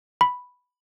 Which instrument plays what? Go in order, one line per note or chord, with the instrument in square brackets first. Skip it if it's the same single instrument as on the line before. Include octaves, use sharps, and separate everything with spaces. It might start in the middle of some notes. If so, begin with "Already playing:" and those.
[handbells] B5